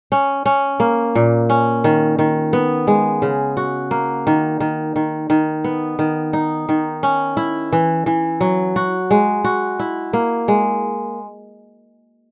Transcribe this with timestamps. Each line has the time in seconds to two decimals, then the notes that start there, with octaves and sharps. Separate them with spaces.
0.12 C#4
0.46 C#4
0.80 A#3
1.15 A#2
1.50 C#4
1.84 D#3
2.19 D#3
2.53 B3
2.87 G#3
3.22 C#3
3.57 F#4
3.91 A#3
4.27 D#3
4.60 D#3
4.96 D#3
5.30 D#3
5.64 B3
5.99 D#3
6.33 D#4
6.69 D#3
7.03 C#4
7.37 E4
7.73 E3
8.06 E3
8.41 F#3
8.76 F#4
9.11 G#3
9.44 F#4
9.79 E4
10.13 A#3
10.48 G#3